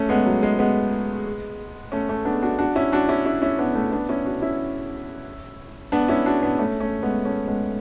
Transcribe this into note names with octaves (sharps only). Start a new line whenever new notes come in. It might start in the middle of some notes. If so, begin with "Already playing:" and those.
Already playing: A3 C#4
G#3 B3
F#3
G#3
G#3 B3
A3 C#4
A3 C#4
B3 D4
D4 F#4
D4 F#4
C#4 E4
D4 F#4
C#4 E4
C#4 E4
C#4 E4
B3 D4
A3 C#4
B3 D4
C#4 E4
D4 F#4
C#4 E4
B3 D4
C#4 E4
D4 F#4
B3 D4
A3 C#4
A3 C#4
G#3 B3
A3 C#4
G#3 B3